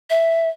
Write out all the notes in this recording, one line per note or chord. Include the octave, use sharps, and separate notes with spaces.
E5